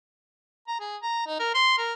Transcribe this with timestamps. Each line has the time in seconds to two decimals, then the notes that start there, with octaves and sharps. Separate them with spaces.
0.68 A#5
0.80 G#4
1.02 A#5
1.27 D#4
1.40 A#4
1.54 C6
1.78 A#4